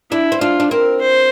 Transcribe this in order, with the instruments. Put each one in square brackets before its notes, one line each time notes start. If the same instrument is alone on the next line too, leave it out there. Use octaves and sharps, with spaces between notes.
[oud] D4 [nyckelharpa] E4
[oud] C4
[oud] D4 [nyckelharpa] F4
[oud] D4
[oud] C4 [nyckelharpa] A#4
[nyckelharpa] C5